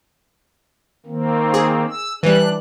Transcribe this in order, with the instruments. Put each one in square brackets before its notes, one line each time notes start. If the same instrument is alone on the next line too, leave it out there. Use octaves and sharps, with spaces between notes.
[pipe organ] D#3 A#3 C4
[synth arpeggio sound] G#4
[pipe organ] E6
[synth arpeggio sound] E3 G3 [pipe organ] D4 F#6